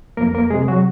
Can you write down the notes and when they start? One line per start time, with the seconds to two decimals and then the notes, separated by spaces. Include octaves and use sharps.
0.17 F2 A#3 A#4
0.35 A#3 A#4
0.50 C3 G#3 G#4
0.68 F#3 F#4